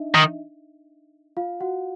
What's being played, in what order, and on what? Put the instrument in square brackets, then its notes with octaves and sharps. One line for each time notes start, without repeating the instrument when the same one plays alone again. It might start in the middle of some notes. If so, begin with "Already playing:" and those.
Already playing: [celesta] D4 D#4 D#5 E5
[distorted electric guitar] D#3
[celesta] F4 F5
F#4 F#5